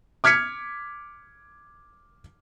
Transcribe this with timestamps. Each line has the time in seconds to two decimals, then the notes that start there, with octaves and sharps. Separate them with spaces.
0.24 D6 F6 G#6 B6 C#7